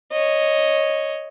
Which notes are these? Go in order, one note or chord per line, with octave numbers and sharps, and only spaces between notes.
C#5 D#5